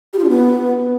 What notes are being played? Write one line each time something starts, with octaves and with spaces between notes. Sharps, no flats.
G4
F4
D4
B3